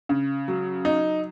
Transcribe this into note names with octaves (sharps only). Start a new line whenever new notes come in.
C#3
F#3
D#4